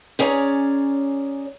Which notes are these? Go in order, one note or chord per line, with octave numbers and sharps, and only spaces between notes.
C#4 G#4 C#5 D5 A#5